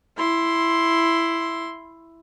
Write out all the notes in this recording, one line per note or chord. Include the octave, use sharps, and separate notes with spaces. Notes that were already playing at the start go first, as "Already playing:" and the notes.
E4 C6